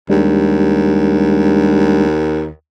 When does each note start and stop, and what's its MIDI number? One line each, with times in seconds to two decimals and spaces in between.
0.10 2.49 39
0.10 2.07 55
0.10 2.07 56
0.10 2.07 62